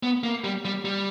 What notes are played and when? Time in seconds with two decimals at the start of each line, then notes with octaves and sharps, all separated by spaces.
0.03 B3
0.23 A#3
0.44 G3
0.65 G3
0.85 G3